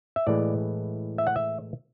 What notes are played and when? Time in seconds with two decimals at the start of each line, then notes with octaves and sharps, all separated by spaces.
0.16 E5
0.27 A2 E3 G#3 D5
1.18 E5
1.27 F#5
1.36 E5